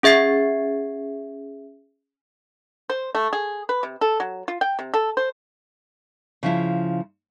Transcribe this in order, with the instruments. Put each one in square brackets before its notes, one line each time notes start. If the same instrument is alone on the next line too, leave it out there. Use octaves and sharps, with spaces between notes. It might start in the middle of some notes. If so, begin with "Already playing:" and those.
[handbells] C#4 G#4 E5 G#6 C7
[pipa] C5
A3
G#4
B4
C3
A4
F#3
F4
G5
C3
A4
C5
[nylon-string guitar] C#3 F3 E4